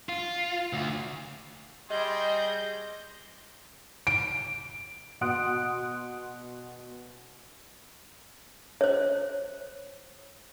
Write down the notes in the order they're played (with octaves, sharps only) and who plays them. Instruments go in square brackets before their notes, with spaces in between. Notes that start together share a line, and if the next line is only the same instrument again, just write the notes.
[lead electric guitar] F4
D2
[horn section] G3 G#4 [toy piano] D#5 [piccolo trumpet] C6 [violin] G6 A#6
[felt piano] D7
[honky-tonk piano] B2 F#5 C6 D#6 F#6 D7
[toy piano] C5 C#5